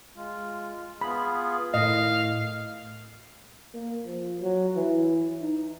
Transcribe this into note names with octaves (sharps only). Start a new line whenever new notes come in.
G#3 F4
B3 F4 G#4 B5
A2 D#3 D#5 F5
A#3
F3
F#3
E3
D#4